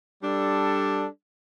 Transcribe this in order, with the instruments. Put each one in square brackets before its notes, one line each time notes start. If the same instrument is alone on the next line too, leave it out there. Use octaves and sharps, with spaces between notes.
[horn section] G3 D4 A4